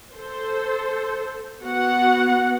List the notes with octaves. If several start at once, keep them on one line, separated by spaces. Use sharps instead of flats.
A4 C5
B3 F#4 F#5